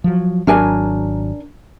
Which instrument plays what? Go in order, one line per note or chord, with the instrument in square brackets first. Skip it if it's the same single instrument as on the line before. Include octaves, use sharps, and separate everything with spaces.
[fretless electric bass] F3 F#3
[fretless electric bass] G#1 F#3 [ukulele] D4 A#4 G#5